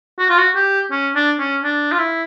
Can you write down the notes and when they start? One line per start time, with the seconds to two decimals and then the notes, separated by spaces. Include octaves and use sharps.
0.19 F#4
0.29 F4
0.38 F#4
0.56 G4
0.91 C#4
1.16 D4
1.39 C#4
1.64 D4
1.92 F4
1.98 E4